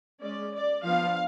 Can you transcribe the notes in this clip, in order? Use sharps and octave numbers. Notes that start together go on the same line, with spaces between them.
G#3 C#4 D5
D5
F3 B3 D4 F5